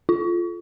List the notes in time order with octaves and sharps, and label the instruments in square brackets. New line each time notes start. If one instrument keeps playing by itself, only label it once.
[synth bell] F4